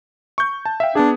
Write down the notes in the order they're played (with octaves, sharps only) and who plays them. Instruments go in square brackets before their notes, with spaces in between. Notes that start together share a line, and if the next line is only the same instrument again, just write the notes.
[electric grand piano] C#6 G6
A5
E5 F5 G5
[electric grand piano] B3 G#4 [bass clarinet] D4